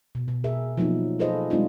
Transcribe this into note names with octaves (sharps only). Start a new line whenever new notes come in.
B2
B2
G#4 A#4 E5
F3 F#3 A#3 B3 D#4
F4 G#4 A4 B4 C5 D#5
G3 G#3 C4 D4 D#4 F4